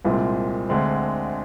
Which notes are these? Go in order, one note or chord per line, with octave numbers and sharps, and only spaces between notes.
C2 A#2 G#3 C4
D2 D3 G#3 C4